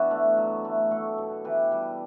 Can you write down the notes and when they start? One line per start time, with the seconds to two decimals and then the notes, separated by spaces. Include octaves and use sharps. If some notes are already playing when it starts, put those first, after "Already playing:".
Already playing: E3 B3 D4 F#4
0.11 A3
0.37 F#3
0.65 A3
0.91 A3 F#4 A4
1.18 B2
1.45 E3 G4 B4
1.72 G3